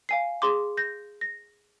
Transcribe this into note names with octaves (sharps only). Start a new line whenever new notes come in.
F5 G#5 C7
G#4 C6 D6
G6 A#6
A#6